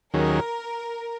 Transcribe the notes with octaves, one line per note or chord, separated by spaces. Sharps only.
D#2 D#3 F#3 C#4 G#4 A#4